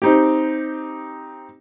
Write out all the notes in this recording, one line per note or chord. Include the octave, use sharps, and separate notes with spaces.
C4 D#4 G4